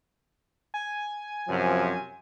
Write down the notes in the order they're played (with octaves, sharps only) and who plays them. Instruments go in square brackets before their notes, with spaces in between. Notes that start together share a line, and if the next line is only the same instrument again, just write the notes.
[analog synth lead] G#5
[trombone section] F#2 C3 F3